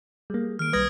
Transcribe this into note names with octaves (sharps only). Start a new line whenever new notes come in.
G3 A#3 G#4
D#3 F6 D7
C2 G3 B4 D#6 G#6 A#6